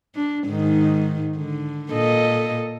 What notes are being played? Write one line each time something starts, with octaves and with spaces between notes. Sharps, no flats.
D4
G#2 D#3
D3
A#2 A4 D#5